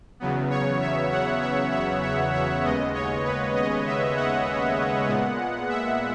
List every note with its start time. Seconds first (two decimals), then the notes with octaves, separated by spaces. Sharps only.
0.20 E2 C#3 F#3 B3
0.50 C#5
0.80 E5
1.11 F#5
1.42 E5
1.72 E5
2.03 E5
2.33 E5
2.64 D#2 C#3 G#3 B3 D#5
2.94 C#5
3.25 B4
3.55 D#5
3.86 E5
4.16 F#5
5.08 A#2 G#3 B3
5.69 E5